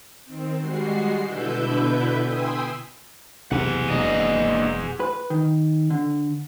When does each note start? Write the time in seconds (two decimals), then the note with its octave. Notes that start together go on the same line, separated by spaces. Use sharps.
0.25 D#3 C4
0.58 G3 G#3 F#4 C7
1.22 B2 D3 E4 B4 E5 G6
2.21 G5 G#5 B5 C6 D#6 E6
3.51 B1 E2 C3 G#4 F#5
3.90 E1 F#3 A#3 D4 D#5
5.00 B4
5.30 D#3
5.90 D3